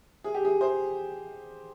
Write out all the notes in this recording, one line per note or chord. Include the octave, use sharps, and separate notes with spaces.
G#4
G4
G#4
G#4 C5